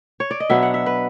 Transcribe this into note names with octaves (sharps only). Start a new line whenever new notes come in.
C#5
D5
D#5
B2 F#3 B3 D4 E5
F#5
E5
B4